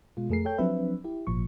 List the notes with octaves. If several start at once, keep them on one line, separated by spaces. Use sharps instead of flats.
B2 G#3 F4
F2 A3 G#4 A#4 C7
A4 C#5 G5 G6
F3 F#3 C4 D4 B4 E5
E4 G4
G#1 A#2 F3 C#6